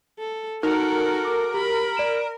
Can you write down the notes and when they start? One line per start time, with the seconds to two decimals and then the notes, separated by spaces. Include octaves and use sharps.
0.19 A4
0.63 D#4 F#4 A4 A#4
1.25 D6
1.54 G4 B5
1.97 D5 D7 E7